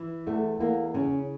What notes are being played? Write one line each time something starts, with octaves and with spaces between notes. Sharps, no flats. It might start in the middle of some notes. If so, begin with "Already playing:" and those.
Already playing: E3
E2 A3
E2 A#3
C#3 C#4